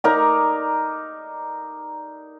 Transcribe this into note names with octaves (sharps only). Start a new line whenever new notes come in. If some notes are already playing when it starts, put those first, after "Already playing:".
D#4 A#4 D5 A#5